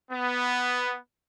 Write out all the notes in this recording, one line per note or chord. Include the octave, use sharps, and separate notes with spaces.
B3